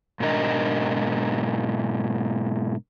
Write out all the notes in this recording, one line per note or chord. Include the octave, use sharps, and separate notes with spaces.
G#2 B2 D4 A#4 D#5